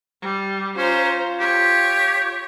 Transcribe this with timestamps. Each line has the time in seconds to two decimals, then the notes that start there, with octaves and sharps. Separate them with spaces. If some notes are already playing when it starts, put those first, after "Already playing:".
0.21 G3
0.77 C#4 F4 C5 A#5
1.40 G4 C#5